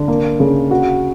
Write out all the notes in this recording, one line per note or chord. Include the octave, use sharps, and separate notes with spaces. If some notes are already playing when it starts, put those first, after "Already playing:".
Already playing: D3
A#3
C#3
F#4